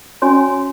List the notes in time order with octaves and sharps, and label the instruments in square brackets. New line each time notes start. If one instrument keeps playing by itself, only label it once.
[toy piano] C#4 F#4 C#5 G#5 C6